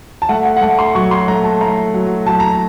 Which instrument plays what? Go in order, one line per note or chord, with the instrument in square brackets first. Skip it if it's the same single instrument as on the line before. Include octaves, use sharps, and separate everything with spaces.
[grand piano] A5
A3 F#5
F#5
F#5
A3 A5
C6
F#3 C#6
C6
A3 A#5
A5
A3 A#5
F#3
F#3 A5
A#5